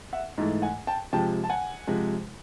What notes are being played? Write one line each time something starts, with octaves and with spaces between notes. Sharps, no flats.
E5 F#5
G#2 E3 A3
F#5 G#5
G5 A5
C3 F3 G#3 G5 A5
A5
F#5 G#5
C3 F3 G#3